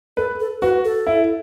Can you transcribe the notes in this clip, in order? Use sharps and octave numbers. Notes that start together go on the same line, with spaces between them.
A4 B4
A4
F#4 B4
A4
E4